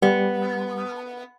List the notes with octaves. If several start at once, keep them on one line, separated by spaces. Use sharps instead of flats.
G3 B3